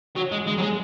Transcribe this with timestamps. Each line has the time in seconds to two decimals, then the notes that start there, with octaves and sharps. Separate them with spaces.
0.16 F#3
0.32 G#3
0.47 G#3
0.57 F#3
0.62 G#3